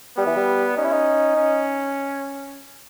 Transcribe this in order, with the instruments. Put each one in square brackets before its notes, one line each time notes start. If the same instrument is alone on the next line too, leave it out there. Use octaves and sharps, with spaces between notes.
[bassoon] G3 [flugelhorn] B3
[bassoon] E3
G3
[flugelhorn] C#4 [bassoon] D#4
[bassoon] E4
D#4
[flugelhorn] C#4